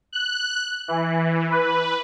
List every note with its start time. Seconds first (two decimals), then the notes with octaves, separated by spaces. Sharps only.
0.13 F#6
0.88 E3
1.50 B4